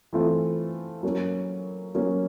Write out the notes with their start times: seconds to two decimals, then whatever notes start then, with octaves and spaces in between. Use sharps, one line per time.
0.13 E3 A3 C4 F4
1.03 F#3 A#3 C#4
1.95 F#3 A#3 C#4